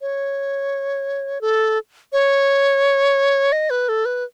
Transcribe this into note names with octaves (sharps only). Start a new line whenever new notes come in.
C#5
A4
C#5
D#5
B4
A4
B4